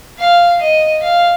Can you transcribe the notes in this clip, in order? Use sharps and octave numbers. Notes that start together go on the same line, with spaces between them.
F5
D#5
F5